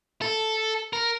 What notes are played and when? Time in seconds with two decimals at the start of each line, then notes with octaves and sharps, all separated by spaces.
0.22 A4
0.93 A#4